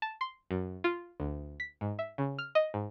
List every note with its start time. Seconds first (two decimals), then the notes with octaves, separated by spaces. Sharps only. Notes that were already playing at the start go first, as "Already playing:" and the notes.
0.02 A5
0.21 C6
0.51 F#2
0.84 F4
1.20 D2
1.60 B6
1.81 G#2
1.99 E5
2.18 C#3
2.39 F6
2.55 D#5
2.74 G#2